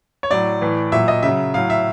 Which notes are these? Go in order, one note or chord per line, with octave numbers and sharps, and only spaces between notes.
C#5
A2 F#3 D5
A2 E3
A#2 F#3 E5
D#5
C#3 F#3 E5
A2 F#3 F5
E5